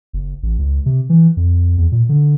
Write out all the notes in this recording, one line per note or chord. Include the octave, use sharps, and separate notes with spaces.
F#1
A1
C#2
C3
E3
F2
E2
A#2
D3